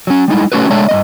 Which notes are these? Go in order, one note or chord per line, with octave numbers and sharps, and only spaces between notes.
F#3 C#4
G3 G#3 D#4 E4
A3 C#4 F#4 G4 B4
G#3 A3 D4 C#5 E5 A5
G2 A#3 D#5